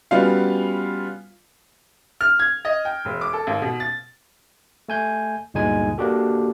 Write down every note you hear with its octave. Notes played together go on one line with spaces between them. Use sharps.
G3 B3 C#4 F4 F#4 F5
F6
G#6
D#5
G5
E1
D6
A4
G#1
B2
A6
A3 G#5 G6
D2 G2 A#2 G#3 D#4 G#5
A#3 D4 F#4 G4 A4